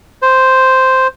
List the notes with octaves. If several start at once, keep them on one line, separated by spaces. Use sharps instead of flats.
C5